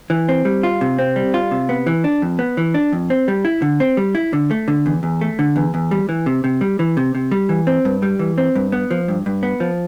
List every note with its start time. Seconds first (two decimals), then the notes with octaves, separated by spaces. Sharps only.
0.10 E3
0.29 C4
0.45 G3
0.63 F4
0.81 C3
0.99 C4
1.16 G3
1.34 F4
1.51 C3
1.69 B3
1.86 E3
2.04 D4
2.22 F2
2.39 B3
2.57 E3
2.74 D4
2.92 F2
3.10 C4
3.28 G3
3.45 E4
3.62 D3
3.80 C4
3.97 G3
4.15 E4
4.33 D3
4.51 A3
4.68 D3
4.86 E2
5.03 E2
5.21 A3
5.39 D3
5.56 E2
5.74 E2
5.91 G3
6.09 E3
6.26 C3
6.44 C3
6.61 G3
6.79 E3
6.97 C3
7.15 C3
7.31 G3
7.49 E3
7.67 C4
7.85 G2
8.03 G3
8.19 E3
8.38 C4
8.56 G2
8.72 B3
8.91 F3
9.08 G2
9.26 G2
9.43 B3
9.60 F3